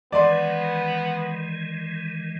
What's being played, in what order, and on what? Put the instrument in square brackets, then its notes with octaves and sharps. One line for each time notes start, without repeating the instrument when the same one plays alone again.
[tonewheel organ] D#3 E3 G#3 [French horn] B3 [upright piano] D5 C6